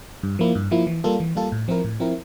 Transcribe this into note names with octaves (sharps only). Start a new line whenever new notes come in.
G2
F3 A#3 E4
G2
F3 A#3 E4
E3
G3 A#3 F4 A4
E3
G3 A#3 F4 A4
A2
F3 C4 E4 A#4
A2
F3 C4 E4 A#4